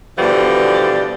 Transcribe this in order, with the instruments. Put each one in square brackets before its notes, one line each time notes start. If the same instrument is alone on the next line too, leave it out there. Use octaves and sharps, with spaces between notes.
[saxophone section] B2 D3 E3 F3 G3